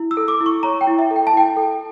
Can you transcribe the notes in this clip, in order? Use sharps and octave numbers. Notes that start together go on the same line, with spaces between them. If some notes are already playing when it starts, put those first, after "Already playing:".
Already playing: E4
E6
A4
D6
E4
C#6
C#5 A#5
G5
E4
E5
A4
G5
A5
E4 G5
A4